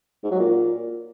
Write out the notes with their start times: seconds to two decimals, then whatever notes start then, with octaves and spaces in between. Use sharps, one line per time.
0.23 G#2
0.31 F#3
0.39 A#2